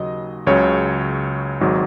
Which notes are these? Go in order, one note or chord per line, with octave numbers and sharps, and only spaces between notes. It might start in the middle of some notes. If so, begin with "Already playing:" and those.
Already playing: D#2 C#3 F#3 D#5
C#2 C#3 F#3 C#5
G#1 G#2 F#3